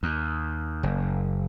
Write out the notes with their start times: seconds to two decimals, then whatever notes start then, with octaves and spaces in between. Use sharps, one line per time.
0.03 D#2
0.83 F#1